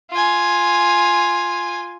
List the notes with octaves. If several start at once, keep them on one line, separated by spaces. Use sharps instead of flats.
F4 G#5